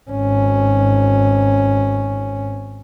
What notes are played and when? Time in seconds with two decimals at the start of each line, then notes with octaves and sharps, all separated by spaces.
0.10 G#1 C#4